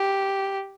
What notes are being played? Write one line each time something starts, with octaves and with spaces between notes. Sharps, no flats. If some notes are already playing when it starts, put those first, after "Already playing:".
Already playing: G4